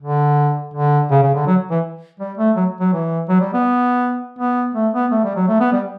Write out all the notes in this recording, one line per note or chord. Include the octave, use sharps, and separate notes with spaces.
D3
D3
C#3
C#3
D3
F#3
E3
G3
A3
F#3
F#3
E3
F#3
G3
B3
B3
A3
B3
A3
G3
F#3
A3
B3
G3